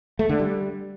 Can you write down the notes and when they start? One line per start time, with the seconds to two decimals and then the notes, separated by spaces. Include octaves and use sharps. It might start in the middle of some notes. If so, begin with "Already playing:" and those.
0.19 A3
0.29 D3
0.40 G3